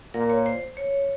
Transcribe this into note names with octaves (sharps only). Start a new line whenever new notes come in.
A#2 A#4
C#5
C5
C#5